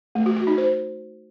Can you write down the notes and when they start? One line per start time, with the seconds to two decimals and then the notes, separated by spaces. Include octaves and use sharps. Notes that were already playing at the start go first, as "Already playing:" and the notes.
0.15 A3
0.26 F#4
0.37 F#4
0.47 D#4
0.58 C5